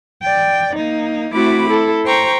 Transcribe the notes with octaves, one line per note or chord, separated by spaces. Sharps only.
D5 G5
A#3 D#4
A3 C4 E4 F#4 B5 D6
E4 A4
C5 G5 A#5 C#6